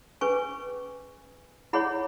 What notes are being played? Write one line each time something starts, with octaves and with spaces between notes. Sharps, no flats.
C#4 G#4 B4 G#5 C#6
E4 G#4 C#5 F#5 B5